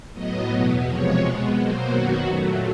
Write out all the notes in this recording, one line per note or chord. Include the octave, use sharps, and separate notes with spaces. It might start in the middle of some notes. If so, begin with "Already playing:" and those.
A2 F#3 B3 D#5
E2 B2 F#3 B3
C3 F3 G#3 C#5
B2 G#3 B3
B2 F#3 A#3 C5
F#2 D#3 F#3 B3 F#4
A#2 F#3 A3